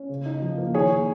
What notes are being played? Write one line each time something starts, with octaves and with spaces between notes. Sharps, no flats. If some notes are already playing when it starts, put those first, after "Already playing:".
Already playing: C#4
C#3
D#4
F3
A#3
D#3 G#4 C#5
D#3